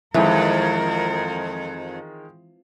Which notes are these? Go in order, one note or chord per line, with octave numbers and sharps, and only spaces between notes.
F2 D#3 E3 G#3 A#4